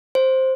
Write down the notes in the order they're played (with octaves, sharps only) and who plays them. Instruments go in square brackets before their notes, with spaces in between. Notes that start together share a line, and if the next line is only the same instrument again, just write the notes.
[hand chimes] C5